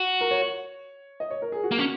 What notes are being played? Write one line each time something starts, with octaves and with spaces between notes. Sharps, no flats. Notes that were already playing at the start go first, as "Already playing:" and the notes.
Already playing: F#4
A#4
C#5
D#5
C#5
A#4
G#4
F#4
A#3
C#4